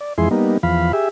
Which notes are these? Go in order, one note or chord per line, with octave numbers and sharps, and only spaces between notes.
D5
F2 E3 G#3 E4 G#4 C6
G3 A#3 B3 D#4
E2 F3 F5 B5
G4 G#4 E5